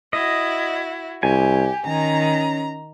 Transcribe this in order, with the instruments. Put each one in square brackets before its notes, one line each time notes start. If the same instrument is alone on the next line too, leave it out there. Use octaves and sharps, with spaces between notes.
[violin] E4 F#4 [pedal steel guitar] D#5
[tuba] C2 [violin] G4 [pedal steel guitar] G#5
[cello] D#3 [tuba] C#4 [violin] A#5